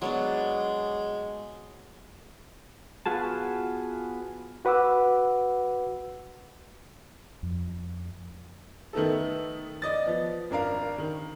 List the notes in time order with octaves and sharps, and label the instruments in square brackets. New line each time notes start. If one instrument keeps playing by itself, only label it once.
[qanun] F#3 B3 D4 [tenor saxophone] G#3
[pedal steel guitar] B3 F4 F#4 G#4 A5
[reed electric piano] F#4 B4 F#5 D6 E6
[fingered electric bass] F2
[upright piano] D#3 A3 B3 D#4 A4
D5 D#5 A6
F3 B3
G#1 D4 A#4 F5
D#3